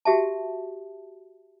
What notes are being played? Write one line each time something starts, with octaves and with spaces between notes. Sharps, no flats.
F#4 G4 E5 A5